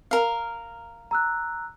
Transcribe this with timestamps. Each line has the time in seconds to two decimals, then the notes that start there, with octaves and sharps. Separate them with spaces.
0.11 A#4 F5
1.11 A#5 E6 F#6